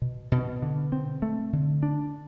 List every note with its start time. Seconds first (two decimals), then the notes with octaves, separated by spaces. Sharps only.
0.02 B2
0.32 B2
0.62 D3
0.92 C4
1.22 A3
1.53 D3
1.83 D4